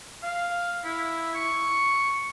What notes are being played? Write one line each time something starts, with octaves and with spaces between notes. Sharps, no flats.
F5
E4
C#6